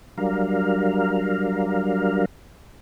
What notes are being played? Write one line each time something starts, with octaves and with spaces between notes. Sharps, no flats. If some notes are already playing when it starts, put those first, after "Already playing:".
F#3 G3 D4 A#4 F5